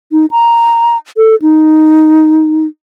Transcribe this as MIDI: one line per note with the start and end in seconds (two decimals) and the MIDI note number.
0.12 0.26 63
0.31 0.97 82
1.17 1.35 69
1.42 2.66 63